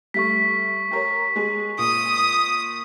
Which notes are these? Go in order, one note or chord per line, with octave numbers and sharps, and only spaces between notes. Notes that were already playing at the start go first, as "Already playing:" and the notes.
G3 A3 C#6 B6
G4 A#4 C#5
G#3 G#4
A#2 D#6